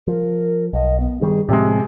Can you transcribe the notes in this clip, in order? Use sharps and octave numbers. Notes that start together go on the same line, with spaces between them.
F3 A#4
B1 D#5
B3
G2 D#3 G3 G#4
A2 C3 F3 G#3 C4 G4